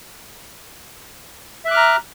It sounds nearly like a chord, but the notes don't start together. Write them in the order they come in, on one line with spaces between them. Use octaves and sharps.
E5 F#6 D6 F6 A#5